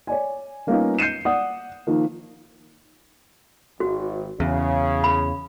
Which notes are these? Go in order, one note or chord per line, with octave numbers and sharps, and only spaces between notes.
C#5 D5 G#5
G3 A#3 B3 C#4 D#4 F4
G6 C7 C#7 D#7 E7
D5 F#5 D#6
D#3 F3 A#3
G#1 F#4
E2 C#3
B5